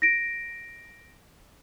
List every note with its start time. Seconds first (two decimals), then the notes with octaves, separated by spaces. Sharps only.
0.02 A#6 D7